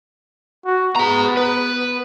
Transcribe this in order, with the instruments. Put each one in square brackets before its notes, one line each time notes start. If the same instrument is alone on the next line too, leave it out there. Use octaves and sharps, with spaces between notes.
[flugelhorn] F#4
[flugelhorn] B3 [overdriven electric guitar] G#4 A#5
[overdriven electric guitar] B4